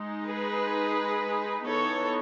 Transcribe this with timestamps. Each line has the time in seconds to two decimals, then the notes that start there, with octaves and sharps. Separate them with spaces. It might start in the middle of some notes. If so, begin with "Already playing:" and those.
Already playing: G#3 D#4
0.26 G#4 B4
1.65 E3 B3 D#4 A4 C#5